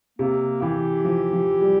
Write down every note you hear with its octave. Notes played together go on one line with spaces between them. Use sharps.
C3 A#3
E3 G4
F3
F3
G3